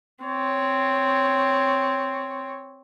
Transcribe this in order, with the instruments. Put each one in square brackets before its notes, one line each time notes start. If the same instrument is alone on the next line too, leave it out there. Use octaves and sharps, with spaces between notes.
[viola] C4 C#5